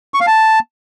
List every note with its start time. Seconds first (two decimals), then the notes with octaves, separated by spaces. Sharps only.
0.14 C#6
0.20 F5
0.27 A5